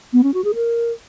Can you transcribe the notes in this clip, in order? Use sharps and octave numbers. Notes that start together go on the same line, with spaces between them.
B3
C#4
F#4
G#4
A#4